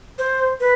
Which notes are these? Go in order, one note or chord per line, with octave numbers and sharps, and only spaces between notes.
C5
B4